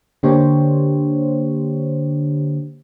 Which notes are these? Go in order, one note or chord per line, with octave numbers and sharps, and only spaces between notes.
D3 A#3 D4 G4 C5 C#5